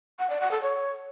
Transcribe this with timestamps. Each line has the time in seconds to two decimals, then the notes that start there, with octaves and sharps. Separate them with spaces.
0.19 F#5
0.30 D5
0.40 F#5
0.51 A4
0.62 C#5